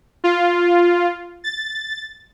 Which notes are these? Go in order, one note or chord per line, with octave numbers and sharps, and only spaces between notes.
F4
A6